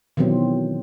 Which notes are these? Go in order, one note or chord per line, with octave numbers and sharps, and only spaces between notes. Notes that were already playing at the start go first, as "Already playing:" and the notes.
B2 D#3 E3 F#3 C4